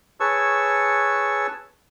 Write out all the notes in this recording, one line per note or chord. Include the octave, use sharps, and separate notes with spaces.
G#4 B4 C#5 A5 C#6 E6